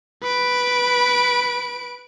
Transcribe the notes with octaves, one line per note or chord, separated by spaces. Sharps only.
B4 D7